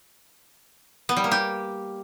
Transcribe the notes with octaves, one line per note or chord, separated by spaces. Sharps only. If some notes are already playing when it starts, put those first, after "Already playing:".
B3
G3
A#3
G4